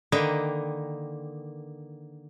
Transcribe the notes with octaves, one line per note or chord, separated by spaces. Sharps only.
D3 D#3 A#3 B4 D#5 G5